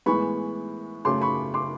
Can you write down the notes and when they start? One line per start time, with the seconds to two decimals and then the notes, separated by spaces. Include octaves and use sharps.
0.06 A2 E3 G#3 B3 B5 C#6
1.05 F#2 C#3 F#3 A3 C6 D6
1.21 B5 C#6
1.54 C6 D6